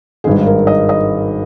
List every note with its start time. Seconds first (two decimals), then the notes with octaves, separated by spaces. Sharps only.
0.24 G#1 G2 D#3 G#3 G#4
0.46 A#4
0.67 D#5
0.89 D#5